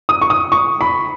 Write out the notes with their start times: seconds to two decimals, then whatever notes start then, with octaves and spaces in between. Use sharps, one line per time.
0.09 D#6
0.22 C#6
0.30 D#6
0.52 C#6
0.81 B5